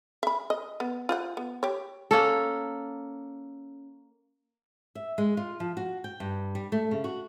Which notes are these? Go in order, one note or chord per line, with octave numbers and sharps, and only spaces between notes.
E5 B5
D#5
B3
F4 C5 F#5
B3
G4 C#5
A#3 C#4 A4
E5
G#3
F4
F3
F#4
G5
G2
G3
A3
C#3
F#4